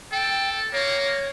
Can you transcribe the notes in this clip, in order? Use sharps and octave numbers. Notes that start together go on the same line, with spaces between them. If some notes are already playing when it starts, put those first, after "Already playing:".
A4 G5
A#3 C#5